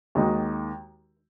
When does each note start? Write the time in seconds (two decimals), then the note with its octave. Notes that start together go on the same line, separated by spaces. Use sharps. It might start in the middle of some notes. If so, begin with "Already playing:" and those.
0.15 D#2 D#3 G#3 D#4 F#4